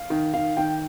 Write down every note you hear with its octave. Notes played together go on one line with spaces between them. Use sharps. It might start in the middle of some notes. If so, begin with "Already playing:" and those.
Already playing: F5
D#3
D#3 F5
D#3 G5